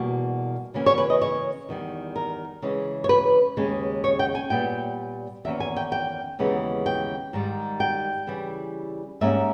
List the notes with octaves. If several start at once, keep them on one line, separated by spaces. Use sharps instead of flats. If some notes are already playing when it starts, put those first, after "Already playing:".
Already playing: E2 B2 G3 A#3
C#3 E3 A#3 C#4
C#5
B4
D#5
C#5
E2 D#3 G3
A#4
C#3 E3 G#3
C#5
B4
D#2 C#3 G#3 C#4
C#5
G5
G#5
A#2 G3 B3 G5
E2 D#3 A#3 C#4 E5
G#5
G5
G5
D#2 C#3 E3 G#3 B3
G5
G#2 D#3 G3
G5
C#3 E3 G3
G#2 G3 A#3 C#4 E5